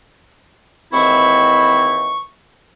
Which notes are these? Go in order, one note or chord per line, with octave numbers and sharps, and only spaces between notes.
D#2 G#2 E3 C4 E4 C#6